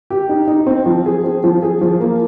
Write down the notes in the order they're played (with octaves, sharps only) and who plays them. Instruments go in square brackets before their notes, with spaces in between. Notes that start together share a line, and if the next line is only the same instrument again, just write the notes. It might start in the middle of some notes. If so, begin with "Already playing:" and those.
[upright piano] G4
D#4
D#4
C4
F3
G#4
C4
F3
G#4
F3
A#3